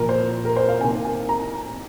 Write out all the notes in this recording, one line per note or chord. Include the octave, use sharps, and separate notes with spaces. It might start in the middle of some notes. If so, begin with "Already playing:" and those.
Already playing: A#2 F3 A#3 A#4
C5
A#4
C5
F5
C3 D#3 A#3 G#5
G#5
A#5